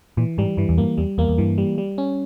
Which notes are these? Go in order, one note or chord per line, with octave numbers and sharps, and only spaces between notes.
A#2 E3
G#2 G3
G2 E3
E2
G2 A#3
E2 G3
E2 A#3
E2
G2 E3
G3
G3
C#4